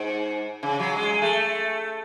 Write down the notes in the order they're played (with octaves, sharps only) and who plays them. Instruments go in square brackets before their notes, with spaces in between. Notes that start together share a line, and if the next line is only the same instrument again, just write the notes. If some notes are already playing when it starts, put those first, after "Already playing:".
Already playing: [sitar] G#2
C#3
F#3
G#3
A3